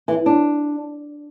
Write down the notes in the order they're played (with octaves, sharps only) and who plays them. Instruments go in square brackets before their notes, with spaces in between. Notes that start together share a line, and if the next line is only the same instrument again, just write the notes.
[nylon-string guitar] E3
D4